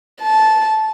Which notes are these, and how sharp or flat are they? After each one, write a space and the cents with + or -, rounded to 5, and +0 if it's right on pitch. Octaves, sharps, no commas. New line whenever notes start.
A5 -10